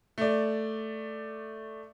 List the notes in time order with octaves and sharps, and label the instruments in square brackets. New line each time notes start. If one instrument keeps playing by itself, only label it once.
[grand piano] A3 D5